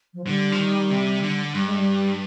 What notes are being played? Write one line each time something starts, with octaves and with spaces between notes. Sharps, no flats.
F3
D3 G3
F3
D#3
C3
D3
G2 G3
G#3
G3